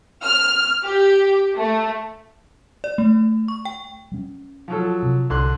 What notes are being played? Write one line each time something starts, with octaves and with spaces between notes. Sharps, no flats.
F6
G4
A3
D5
A3
C#6
G5
G3 C#4
F3 F#3 A4
C3
C2 D3 C6 F#6